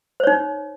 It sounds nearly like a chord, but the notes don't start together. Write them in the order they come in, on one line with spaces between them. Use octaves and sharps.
C5 C#5 D#4